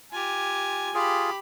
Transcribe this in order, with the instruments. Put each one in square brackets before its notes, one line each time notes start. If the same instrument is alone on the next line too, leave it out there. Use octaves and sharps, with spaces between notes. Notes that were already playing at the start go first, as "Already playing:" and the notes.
[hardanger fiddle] F4 G4 [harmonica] G#5
[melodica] F4 G#4 [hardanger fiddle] G4 B5